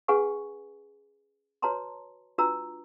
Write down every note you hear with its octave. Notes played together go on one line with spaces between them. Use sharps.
C#4 G#4 B4 F#5 G#5 C#6
F#4 B4 C#5 A5 A#5 C6
D4 F4 F#4 B4 A#5 E6